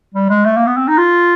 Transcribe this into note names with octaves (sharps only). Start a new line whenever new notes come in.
G3
G#3
A3
A#3
B3
C4
D#4
F4